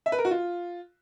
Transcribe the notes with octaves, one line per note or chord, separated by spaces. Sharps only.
E5
B4
A#4
F#4
F4